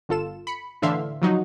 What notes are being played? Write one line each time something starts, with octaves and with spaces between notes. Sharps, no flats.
G1 F4 A4 E7
B5 C#7
A2 D3 E3 E5 F5 C6
F3 F#3 D#4 F#4